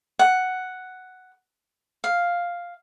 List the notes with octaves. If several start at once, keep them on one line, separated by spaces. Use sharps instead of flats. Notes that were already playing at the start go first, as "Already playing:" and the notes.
F#5
F5